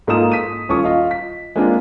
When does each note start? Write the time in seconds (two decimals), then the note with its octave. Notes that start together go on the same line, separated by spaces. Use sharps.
0.07 G#2 A#3 F4 A4 D#6 E7
0.32 D#6 B6 D#7
0.69 D#1 C#4 F4 A4 C#6 D#6
0.84 F4 D#5 F5
1.11 B6
1.56 G#3 A#3 C4 D4 F4